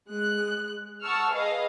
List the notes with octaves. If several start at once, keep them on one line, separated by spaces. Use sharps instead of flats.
G#3 F#6
F#5 A5 C#6 E6 F6
G#4 B4 D#5 F5